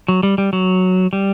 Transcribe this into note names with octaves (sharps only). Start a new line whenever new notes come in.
F#3
G3
G3
F#3
G3